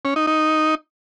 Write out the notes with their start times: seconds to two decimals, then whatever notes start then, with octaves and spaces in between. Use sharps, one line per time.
0.05 C#4
0.16 D#4
0.27 D#4